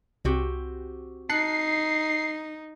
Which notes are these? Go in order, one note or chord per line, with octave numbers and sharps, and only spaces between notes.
C2 C4 F#4 G4
D#4 A5 F#6 C7 C#7